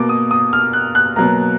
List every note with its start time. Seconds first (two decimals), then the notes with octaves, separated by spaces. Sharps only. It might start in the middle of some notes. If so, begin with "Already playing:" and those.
Already playing: B2 A#3 D6
0.09 D#6
0.31 D#6
0.53 F6
0.73 F#6
0.95 F#6
1.16 B2 F#3 A#3 A#5